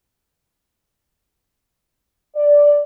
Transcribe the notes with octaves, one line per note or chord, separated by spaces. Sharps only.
D5